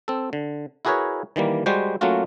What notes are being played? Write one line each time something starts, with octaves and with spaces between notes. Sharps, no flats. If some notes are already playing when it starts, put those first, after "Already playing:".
C4 A4
D3
E4 F#4 G#4 A#4 B4 C#5
D#3 E3 G3 A#3
G3 G#3 F#4 C5
F#3 A3 A#3 C#4 F4 F#4